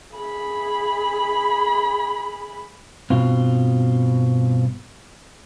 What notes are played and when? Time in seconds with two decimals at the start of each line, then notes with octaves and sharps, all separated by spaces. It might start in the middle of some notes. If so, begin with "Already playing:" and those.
0.14 G#4 B5
3.10 G2 B2 C4 F4